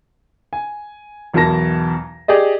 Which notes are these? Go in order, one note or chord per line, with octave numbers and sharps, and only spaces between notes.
G#5
B1 E2 B2 A#4 A5 A#6
G4 G#4 D5 D#5